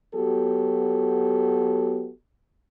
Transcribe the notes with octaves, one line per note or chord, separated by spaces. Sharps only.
F#3 B3 F#4 G4 A4